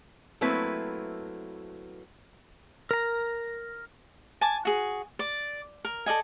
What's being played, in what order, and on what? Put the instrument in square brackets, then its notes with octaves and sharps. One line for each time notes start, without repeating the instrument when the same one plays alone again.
[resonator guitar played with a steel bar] F#3 A3 A#3 C4 E4 B4
[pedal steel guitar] A#4 A#5
[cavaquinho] G#5 A5 D6
F#4 G#4
D5
A#4
A4 D5 D#5 G#5